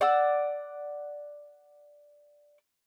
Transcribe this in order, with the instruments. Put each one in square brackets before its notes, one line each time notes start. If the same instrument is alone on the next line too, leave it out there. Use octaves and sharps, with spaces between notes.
[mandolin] D5 F#5 E6